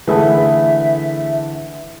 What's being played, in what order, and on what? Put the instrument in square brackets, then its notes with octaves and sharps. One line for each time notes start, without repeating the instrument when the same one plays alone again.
[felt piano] D3 E3 [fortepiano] A3 G#4 B4 [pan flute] E5